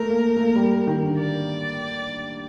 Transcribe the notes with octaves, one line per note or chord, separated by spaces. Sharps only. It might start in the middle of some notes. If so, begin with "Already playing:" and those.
Already playing: A3 A#4
A#3
A3
A#3
G3
D#3
D3
D5